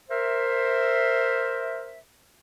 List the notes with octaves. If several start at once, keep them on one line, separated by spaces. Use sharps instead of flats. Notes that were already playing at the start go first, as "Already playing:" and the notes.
A#4 C5 E5